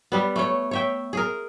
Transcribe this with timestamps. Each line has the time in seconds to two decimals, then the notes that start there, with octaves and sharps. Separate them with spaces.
0.12 G3 B3
0.36 A3 C#5
0.71 C#5 E5 G5
1.13 G#4 A#4